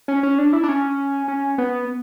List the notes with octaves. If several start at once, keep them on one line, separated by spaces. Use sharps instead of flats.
C#4
C#4
D4
E4
D4
C#4
C#4
B3